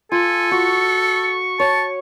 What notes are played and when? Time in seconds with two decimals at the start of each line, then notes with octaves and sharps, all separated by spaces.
0.12 F4 A4 G#5
0.51 F#4 C#6
1.60 C#5 A5